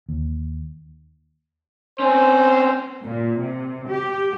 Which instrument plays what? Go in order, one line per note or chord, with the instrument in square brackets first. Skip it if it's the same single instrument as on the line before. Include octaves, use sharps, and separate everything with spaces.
[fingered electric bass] D#2
[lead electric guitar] C4 C#4 [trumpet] C5
[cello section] A#2
C3
G4